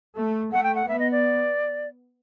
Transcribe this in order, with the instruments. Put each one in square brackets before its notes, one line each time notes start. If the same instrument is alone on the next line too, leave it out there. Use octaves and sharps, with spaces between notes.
[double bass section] A3
[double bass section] A3 [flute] F#5
[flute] G5
F#5
[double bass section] B3 [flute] E5
[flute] D#5
D5